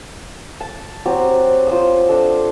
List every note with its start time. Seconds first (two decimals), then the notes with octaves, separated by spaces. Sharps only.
0.60 A5
1.06 F#3 C4 G4
1.67 F4 C5 D#6
2.09 D4 A4